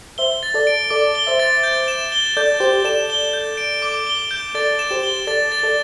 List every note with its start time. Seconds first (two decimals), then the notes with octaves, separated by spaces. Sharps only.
0.18 C5 E5 G7
0.43 A6
0.54 A4 D5
0.67 D7
0.90 A4 D5 D6
1.15 G7
1.27 C5 E5
1.40 A6
1.63 G6
1.88 E7
2.12 G7
2.37 A4 D5 G6
2.60 G4 C5 G6
2.85 A4 D5 E7
3.10 G7
3.33 G6
3.57 D7
3.82 D6
4.07 G7
4.31 G6
4.55 A4 D5 A6
4.79 E7
4.91 G4 C5
5.03 G7
5.27 A4 D5 A6
5.52 A6
5.63 A4 D5